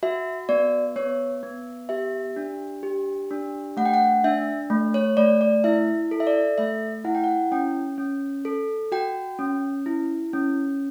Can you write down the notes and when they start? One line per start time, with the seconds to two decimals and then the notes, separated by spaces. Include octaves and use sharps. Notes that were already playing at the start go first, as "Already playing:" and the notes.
0.03 F#4 E5
0.49 B3 D5
0.96 B3 C#5
1.43 B3
1.89 G4 E5
2.36 D4
2.83 G4
3.31 D4
3.77 A3 F#5
3.86 G5
3.94 F#5
4.24 D4 E5
4.70 A3
4.94 C#5
5.17 A3 D5
5.41 D5
5.64 E4 E5
6.11 A4
6.20 E5
6.27 D5
6.58 A3 E5
7.04 E4 F#5
7.15 G5
7.24 F#5
7.52 C#4 G5
7.98 C#4
8.45 A4
8.92 F#4 G5
9.39 C#4
9.86 E4
10.33 C#4